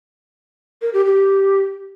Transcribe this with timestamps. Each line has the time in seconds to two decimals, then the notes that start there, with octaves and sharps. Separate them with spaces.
0.82 A#4
0.94 G4
1.05 G4